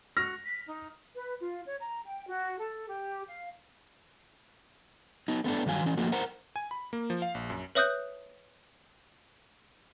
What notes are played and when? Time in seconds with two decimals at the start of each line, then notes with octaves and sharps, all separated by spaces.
0.17 F#4 F6 A#6
0.45 B6
0.67 D#4
1.15 B4
1.40 F4
1.66 C#5
1.81 A#5
2.05 G5
2.28 F#4
2.59 A4
2.88 G4
3.28 F5
5.28 B3 D#4
5.44 A3 B3 D4 A4
5.66 G2 D#3 F#3 F5 G#5
5.83 E3 C#4
5.97 F3 A3 A#3 F#4
6.12 A#4 C5 F#5 A#5
6.56 G#5
6.71 B5
6.93 A#3
7.10 F3
7.22 F5
7.35 A#1
7.50 F#2
7.75 B4 C#5 E5 D#6 F#6 G6